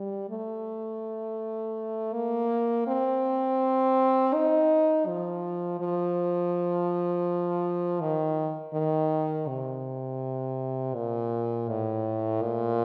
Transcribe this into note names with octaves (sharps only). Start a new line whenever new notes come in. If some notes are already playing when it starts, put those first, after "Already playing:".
Already playing: G3
A3
A#3
C4
D#4
F3
F3
D#3
D#3
C3
A#2
A2
A#2